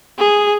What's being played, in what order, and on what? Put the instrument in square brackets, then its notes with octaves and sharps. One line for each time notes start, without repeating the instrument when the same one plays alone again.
[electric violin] G#4